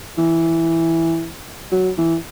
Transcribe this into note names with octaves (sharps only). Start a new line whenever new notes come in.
E3
F#3
E3